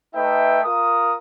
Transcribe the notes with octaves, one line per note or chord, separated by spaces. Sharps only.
A3 D#4 B4 E5 G5
F4 A#4 D#6